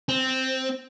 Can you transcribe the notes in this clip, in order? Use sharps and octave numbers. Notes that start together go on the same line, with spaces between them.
C4